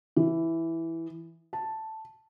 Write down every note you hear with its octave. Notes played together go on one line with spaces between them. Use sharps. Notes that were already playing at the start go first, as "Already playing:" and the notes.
E3
A5